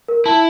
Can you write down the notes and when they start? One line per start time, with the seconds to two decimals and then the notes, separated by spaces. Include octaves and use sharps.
0.08 A#4
0.25 E4 A5